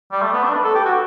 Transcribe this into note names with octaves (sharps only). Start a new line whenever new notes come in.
G3
A3
B3
D4
B4
A4
G4
F#4